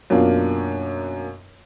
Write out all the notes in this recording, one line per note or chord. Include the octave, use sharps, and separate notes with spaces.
F#2 B2 A#3 D4 F4